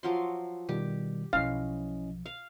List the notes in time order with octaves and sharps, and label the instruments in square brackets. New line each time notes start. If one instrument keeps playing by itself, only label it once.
[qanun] F3 F#3 C6
[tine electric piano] B2 D#3 G3 [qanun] G4
[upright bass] B1 F3 [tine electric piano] C#4 E4 D#5 [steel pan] F5
[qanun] F5